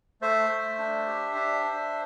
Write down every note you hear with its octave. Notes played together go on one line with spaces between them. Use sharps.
A3 C5 E5
A3
D4
G4
D4
D4